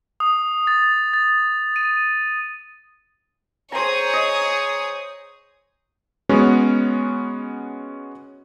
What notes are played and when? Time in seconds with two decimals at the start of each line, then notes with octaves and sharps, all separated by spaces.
0.20 D#6
0.67 A6
1.14 A6
1.76 D#7
3.72 G#4 C5 C#5 A#5 D#6
4.13 D#5
6.29 G#3 B3 C#4 F#4